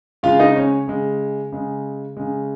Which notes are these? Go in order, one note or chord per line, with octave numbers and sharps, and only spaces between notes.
C#3 G#3 F4 F5
D#4 D#5
C#4 C#5
C#3 G#3
C#3 G#3
C#3 G#3